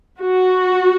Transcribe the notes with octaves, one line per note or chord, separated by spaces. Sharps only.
F#4